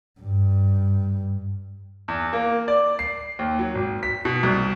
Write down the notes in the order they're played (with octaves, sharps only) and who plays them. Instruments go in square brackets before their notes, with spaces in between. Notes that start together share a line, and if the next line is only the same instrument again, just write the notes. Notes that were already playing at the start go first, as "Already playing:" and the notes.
[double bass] G2
[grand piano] E2
A#3
D5
C7
D#2
F#3
G#1
B6
B2
C2